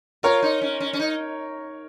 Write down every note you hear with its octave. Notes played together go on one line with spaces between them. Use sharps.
F4 A#4 C#5
D#4
C#4
C#4
C#4
D#4